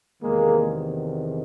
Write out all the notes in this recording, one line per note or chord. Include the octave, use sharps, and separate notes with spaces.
E2 C3 D#3 G#3 A#3